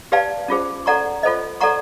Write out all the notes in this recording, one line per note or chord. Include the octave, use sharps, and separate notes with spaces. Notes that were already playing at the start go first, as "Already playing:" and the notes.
G4 B4 D5 F5 A5
C#4 F4 G#4 C5
A4 D5 F#5 A#5 C#6
F4 A4 C5 D#5
A4 D5 F#5 A#5 C#6